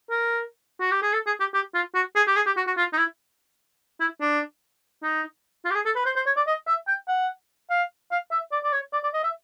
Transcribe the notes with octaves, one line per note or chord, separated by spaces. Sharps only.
A#4
F#4
G4
G#4
A4
G#4
G4
G4
F4
F#4
G#4
G4
G#4
G4
F#4
F#4
F4
D#4
E4
E4
D4
D#4
F4
G4
G#4
A4
B4
C5
C5
C#5
D5
D#5
E5
G5
F#5
F5
F5
E5
D5
D5
C#5
D5
D5
D#5
E5